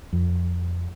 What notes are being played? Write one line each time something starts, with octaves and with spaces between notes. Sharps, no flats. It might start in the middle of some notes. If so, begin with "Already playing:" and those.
F2